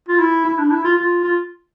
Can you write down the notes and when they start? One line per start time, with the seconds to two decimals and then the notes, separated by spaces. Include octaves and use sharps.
0.09 F4
0.19 E4
0.45 E4
0.58 D4
0.71 E4
0.84 F4
0.97 F4
1.24 F4